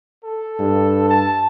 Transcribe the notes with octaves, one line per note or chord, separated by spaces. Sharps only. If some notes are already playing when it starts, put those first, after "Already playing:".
A4
G2
A5